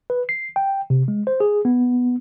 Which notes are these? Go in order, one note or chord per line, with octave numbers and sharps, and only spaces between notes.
B4
C7
G5
C3
G#3
C5
G#4
B3